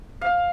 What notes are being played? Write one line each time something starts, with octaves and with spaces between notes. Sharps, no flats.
F5